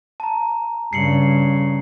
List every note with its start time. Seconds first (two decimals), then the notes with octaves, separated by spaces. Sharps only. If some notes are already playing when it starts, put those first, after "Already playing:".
0.20 A5 A#5
0.93 G2 C#3 C7 C#7 F#7